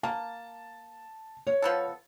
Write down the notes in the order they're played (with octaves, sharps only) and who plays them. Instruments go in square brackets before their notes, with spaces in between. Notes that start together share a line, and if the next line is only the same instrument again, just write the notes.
[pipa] A#3 [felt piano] A5
[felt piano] C#5
[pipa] F3 B3 A4